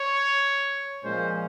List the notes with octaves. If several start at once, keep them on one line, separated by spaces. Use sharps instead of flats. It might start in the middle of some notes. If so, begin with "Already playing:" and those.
Already playing: C#5
A#2 F3 G#3 C#4 C5